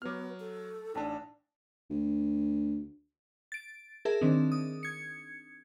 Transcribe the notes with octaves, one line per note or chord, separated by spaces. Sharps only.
F#3 B3 G4 D6 F6
A4
A1 D4 D#4 G5 A5 E6
D2
A6 D7
G#4 A#4 E5 A5
D#3 C4 D4 D#4
D#6
G#6 C#7